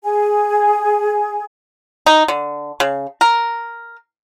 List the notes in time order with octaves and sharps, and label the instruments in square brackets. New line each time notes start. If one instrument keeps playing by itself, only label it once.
[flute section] G#4 G#5
[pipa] D#4
D3
C#3
A#4